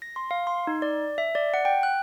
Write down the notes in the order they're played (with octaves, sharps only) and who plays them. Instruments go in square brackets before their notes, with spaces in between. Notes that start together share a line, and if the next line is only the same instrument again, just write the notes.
[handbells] A#6
C6
F5
C6
D#4
D5
E5
D5
F#5
G5
F#6